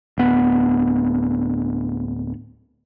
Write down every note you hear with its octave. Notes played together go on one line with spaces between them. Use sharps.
D1 B3